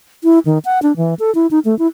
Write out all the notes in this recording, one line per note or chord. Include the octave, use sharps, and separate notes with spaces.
E4
D#3
F#5
D4
E3
A4
E4
D#4
A3
E4